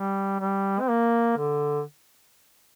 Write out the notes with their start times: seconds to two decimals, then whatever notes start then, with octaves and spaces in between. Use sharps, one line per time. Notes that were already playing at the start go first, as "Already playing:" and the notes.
Already playing: G3
0.40 G3
0.81 C4
0.90 A#3
1.38 D3